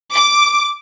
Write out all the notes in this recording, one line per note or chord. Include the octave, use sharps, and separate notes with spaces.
D6